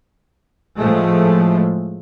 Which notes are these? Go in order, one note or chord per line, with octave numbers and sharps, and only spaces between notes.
A2 F3 G#3 A3